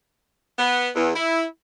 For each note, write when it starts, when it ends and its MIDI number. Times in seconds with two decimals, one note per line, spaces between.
0.59 0.89 59
0.96 1.11 40
1.16 1.44 64